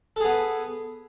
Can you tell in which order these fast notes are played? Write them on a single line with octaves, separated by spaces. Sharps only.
A4 G#4 B3